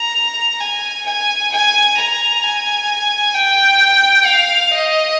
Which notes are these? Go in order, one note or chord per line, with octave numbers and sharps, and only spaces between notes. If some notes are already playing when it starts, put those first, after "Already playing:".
Already playing: A#5
G#5
G#5
G#5
A#5
G#5
G5
F5
D#5